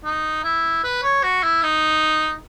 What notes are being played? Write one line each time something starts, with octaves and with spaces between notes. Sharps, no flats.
D#4
E4
B4
C#5
F#4
E4
D#4